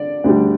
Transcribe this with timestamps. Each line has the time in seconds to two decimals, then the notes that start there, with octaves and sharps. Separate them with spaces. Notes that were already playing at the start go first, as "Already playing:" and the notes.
Already playing: D3 D5
0.24 D2 D3 G3